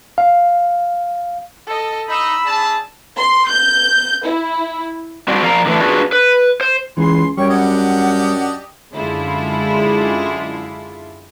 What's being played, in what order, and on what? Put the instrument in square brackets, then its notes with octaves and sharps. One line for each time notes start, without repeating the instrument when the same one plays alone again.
[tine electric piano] F5
[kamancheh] A4 D#5
[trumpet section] D#4 [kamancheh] B5 E6
[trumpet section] D4 G#4 A5
[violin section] C6
G6
E4
[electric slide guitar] G3 C4 D4 F#4
F3 A#4 D5 F5 F#5 A#5
D3 E3 A3 D4
D4 F4 F#4 G#4 B4 D5
B4
C5
[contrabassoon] C#2 [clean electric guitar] E3 G#4 [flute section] C6
[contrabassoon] F#2 [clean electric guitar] G3 [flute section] C#5 G5 [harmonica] C#6
[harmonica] D4 G4 D#5 [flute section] F#5
[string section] F#2 D3 G#3 E4 F4